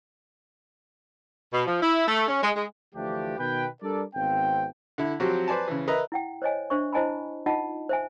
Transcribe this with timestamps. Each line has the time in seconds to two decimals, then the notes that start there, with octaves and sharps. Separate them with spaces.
1.53 B2
1.67 F3
1.82 E4
2.08 A3
2.28 C#4
2.43 G#3
2.56 G#3
2.94 D2 E3 F3 A3 D4 G4
3.38 B2 D#3 B4 G5
3.82 G3 D4 A4 A#4 D5
4.15 G#1 B3 C4 F5 G5
4.98 D3 E4
5.20 F3 F#3 C4 F#4 G4
5.48 B4 C5 D5 G#5 A5
5.68 C#3 E3
5.87 A#4 B4 D#5 E5 A#5
6.12 E4 F#5 G5
6.42 C5 C#5 D#5 G#5
6.70 D4 C5 E5 C#6
6.93 E4 C5 D#5 G#5 A5 B5
7.46 D#4 F4 D#5 F#5 A5
7.89 C5 E5 G#5